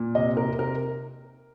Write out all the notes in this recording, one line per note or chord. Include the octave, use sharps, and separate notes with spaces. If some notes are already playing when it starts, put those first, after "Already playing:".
Already playing: A#2
C3 D#5
A#4
C3
A#4